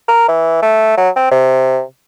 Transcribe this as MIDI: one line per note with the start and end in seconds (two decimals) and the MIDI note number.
0.08 0.28 70
0.29 0.62 52
0.63 0.93 57
0.98 1.09 54
1.16 1.27 60
1.31 1.81 48